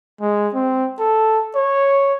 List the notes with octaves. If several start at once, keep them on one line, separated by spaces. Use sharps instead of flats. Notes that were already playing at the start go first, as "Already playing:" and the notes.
G#3
C4
A4
C#5